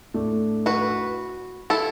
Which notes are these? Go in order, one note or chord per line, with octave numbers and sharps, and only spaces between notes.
A2 A3 D4
F#4 B4
E4 A4